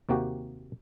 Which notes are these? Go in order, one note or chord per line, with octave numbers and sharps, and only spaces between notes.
D#2 C3 A#3 F#4 G4